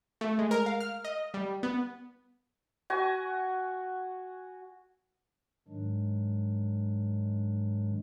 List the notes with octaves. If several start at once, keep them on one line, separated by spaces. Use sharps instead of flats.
A3
G#3
A#4
F5
F6
D#5
G3
B3
F#4 G#5 C#6
G#2 D#3 F#3 G#3 D4